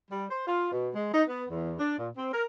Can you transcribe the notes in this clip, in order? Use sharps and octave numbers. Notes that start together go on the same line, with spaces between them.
G3
C5
F4
B2
G#3
D#4
B3
E2
D4
A#2
C4
A#4